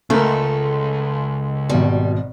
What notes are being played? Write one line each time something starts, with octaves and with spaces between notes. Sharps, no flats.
C#2 A3 A4 A#4
G#1 B2 G3